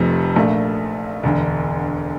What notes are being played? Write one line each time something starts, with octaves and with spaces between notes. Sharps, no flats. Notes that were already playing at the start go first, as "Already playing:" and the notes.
Already playing: F1 F2 C3 F3 A3
A#1 A#2 A3
E1 D2 D3